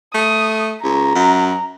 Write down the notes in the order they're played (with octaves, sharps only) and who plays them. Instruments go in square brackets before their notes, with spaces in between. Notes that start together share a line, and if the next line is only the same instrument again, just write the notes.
[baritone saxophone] A3 [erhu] D#6
[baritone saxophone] C#2 [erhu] A#5
[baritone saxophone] F#2